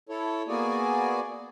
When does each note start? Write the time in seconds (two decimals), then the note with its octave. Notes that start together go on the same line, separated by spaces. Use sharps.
0.09 E4 A4 C#5
0.48 A#3 B3 F#4 G#4 D5 G#5